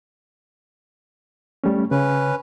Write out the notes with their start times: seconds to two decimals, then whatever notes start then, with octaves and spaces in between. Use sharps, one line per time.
1.64 G3 A3 C#4
1.91 C#3 C#4 B4